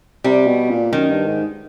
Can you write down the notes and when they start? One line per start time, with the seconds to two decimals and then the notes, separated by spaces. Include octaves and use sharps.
0.24 C3 G3
0.47 B2
0.70 A#2
0.93 F#2 D#3
1.10 G2
1.27 G#2